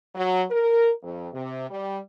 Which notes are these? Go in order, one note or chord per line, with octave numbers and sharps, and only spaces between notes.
F#3
A#4
F2
C3
G3